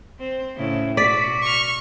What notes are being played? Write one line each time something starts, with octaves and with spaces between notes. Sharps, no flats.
C4 C5
A2 C#3 E4
B2 F#4 D5 B6
C#6 F6